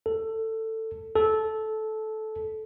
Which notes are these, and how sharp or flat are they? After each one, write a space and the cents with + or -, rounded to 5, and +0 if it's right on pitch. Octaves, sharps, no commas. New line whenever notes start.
A4 +15
A4 -15